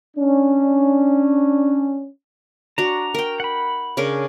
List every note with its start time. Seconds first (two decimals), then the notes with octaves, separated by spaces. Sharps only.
0.17 C#4 D4
2.78 D4 F#4 A#5
3.14 A#4 G5
3.40 F#5 B5
3.97 C#3 D4 A#4